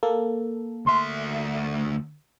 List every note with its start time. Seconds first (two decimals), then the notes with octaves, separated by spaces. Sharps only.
0.03 A#3 A4
0.86 D2 E5 C6